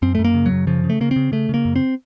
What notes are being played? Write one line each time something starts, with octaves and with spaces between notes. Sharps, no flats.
F#2 C4
A3
F#2
A#3
C#3
F#3
F#2
C#3 F3
C#3
A3
C#3 A#3
C4
C#3
C#3 A3
C#3 A#3
F#2
C4